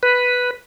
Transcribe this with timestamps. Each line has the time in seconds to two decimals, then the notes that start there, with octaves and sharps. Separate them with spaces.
0.03 B4